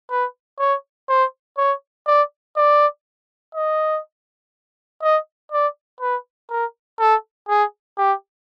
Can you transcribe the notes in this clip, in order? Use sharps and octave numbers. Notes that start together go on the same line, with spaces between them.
B4
C#5
C5
C#5
D5
D5
D#5
D#5
D5
B4
A#4
A4
G#4
G4